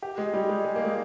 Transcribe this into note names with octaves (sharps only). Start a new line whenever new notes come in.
G4
G#3
G3
G#3
G#3
A#3
G#3